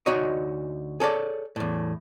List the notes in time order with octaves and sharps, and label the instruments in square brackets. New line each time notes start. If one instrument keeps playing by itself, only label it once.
[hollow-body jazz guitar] D2 D#4 F#4 C#5 D#5
G#4 A4 C#5 D5
E2 A2